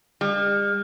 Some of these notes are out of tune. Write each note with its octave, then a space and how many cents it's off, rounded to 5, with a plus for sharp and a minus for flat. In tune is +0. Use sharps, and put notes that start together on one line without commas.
G3 +45